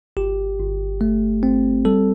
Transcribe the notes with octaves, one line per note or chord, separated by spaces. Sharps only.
G1 G4
G1
A3
C4
G3 A4